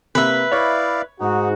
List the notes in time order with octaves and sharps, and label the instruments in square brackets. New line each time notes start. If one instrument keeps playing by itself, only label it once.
[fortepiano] C3 A#3 [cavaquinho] B4 E5
[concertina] E4 D5 F5 [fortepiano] C#5
[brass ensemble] G#2 F#4 [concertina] D#4